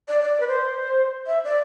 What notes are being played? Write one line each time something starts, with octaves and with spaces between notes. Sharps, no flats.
D5
D5
B4
C5
E5
D5